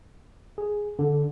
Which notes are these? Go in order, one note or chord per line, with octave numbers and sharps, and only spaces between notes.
G#4
D3